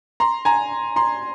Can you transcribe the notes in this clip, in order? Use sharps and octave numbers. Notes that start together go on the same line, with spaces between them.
A#5 C6
G#5 A#5
A#5 C6